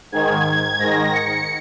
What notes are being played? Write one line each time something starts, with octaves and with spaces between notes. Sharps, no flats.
G#2 D#3 G#6
G#2 D#3 A#6
C#7